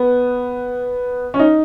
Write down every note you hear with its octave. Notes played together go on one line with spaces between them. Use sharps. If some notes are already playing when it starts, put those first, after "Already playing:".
Already playing: B3
C#4
D#4